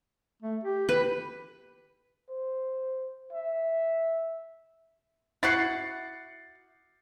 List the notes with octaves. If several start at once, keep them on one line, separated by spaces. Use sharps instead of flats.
A3
G4
B4
C5
E5
E4 F#4 F#5 A6 C7 C#7